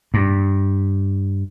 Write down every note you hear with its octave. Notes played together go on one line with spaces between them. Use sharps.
G2